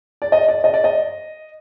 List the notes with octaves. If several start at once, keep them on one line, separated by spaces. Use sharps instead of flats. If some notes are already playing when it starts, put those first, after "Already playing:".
D5
D#5
D5
D#5
D5
D#5